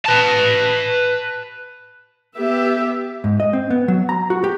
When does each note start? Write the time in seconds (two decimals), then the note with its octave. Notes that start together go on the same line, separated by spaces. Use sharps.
0.06 B4 A5
2.36 B3 G4 E5
3.24 G#2
3.40 D#5
3.53 C4
3.70 B3
3.88 F#3
4.09 A#5
4.30 F#4
4.44 G4